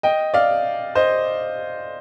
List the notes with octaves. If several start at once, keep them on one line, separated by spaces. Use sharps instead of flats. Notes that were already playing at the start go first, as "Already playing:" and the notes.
D#5 G5
D5 F5
C5 D#5